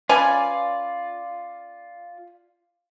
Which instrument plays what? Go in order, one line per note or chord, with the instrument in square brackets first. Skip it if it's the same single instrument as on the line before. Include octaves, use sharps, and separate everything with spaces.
[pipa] C#4 B4 G#5 [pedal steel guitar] F4 D5